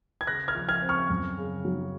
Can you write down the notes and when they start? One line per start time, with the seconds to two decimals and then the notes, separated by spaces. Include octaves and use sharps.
0.21 G#6
0.27 C#3 F#6 A#6
0.48 F6 G#6
0.55 F3
0.69 F6 G#6
0.82 C4
0.89 C#6 F6
1.10 F#2
1.38 C#3
1.65 F#3